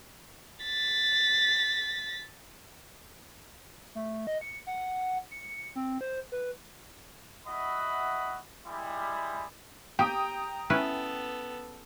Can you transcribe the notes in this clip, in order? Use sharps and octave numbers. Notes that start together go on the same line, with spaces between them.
A6 B6
A3
D#5
C#7
F#5
C#7
C4
C5
B4
E4 F#4 D#5 E5 F#5 B5
G3 G#3 E4
G4 G5 A#5 D#6
B3 C#4 E4 A4 B4